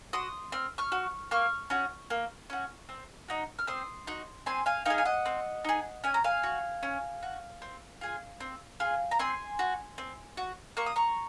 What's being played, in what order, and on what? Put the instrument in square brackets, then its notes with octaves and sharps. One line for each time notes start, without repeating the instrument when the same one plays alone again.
[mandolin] F#4 C6 D#6
C4 F6
C#6 F6
F#4
A#3 C#6 F6
C#4 F#4
A#3
C#4 F#4
C4
D#4 F#4
F6
C4 C6 D#6
D#4 F#4
C4 G#5 C6
F5 G#5
D#4 F5 G#5
G#4
G#5
D#5 F#5
C4
D#4 G#4
C#4 G#5
A#5
F5 G#5
F#4
C#4
F#4
C4
F4 G#4
C4
F4 G#4
A#5
C4 G#5 C6
F#4
C4
F#4
A#3 C#6
D#6
A#5 C#6